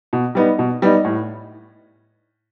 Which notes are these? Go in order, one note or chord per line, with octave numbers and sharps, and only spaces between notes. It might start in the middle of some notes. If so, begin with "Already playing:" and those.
B2
G3 B3 D#4
B2
G3 B3 D#4
A2